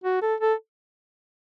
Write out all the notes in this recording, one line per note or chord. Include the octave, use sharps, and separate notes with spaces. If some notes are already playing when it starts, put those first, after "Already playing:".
F#4
A4
A4